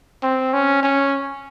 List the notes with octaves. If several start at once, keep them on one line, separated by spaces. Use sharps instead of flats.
C4
C#4
C#4